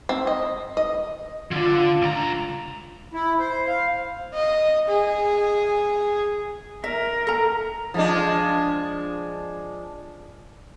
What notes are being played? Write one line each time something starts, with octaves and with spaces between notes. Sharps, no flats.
C4
D#5
D#5
D3 D4 F4
C#2 A#5
E4
C5
F5
D#5
G#4
A#4 E5
A4 A#5
F3 G#3 D4